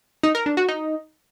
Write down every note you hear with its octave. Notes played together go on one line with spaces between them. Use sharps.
D#4
A#4
D4
F#4
D#4